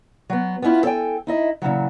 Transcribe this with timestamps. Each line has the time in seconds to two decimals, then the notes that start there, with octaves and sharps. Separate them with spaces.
0.30 F#3 B3
0.62 B3 C#4 D4 E4 F4
0.83 A4 C5 C#5 G5 G#5
1.27 D#4 E4 D#5
1.62 A#2 C#3 E3 F#3